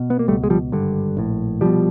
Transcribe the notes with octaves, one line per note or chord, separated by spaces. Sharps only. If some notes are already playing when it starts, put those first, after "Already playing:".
Already playing: B2
B3
A#3
C#2 B2 G3 A3
G#3
F3 G3
G#1 G2 D3
A#1 A2
C2 B2 F3 G3